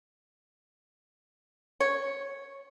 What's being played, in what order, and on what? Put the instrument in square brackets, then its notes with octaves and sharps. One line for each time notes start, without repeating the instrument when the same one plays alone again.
[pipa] C#5